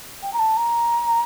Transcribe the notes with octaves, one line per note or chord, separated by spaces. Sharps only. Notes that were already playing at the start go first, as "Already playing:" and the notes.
G5
A#5
A5
A#5